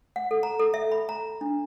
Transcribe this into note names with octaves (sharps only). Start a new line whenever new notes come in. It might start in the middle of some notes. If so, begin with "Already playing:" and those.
F#5
A4
A#5
A4
E5
B5
A#5
D4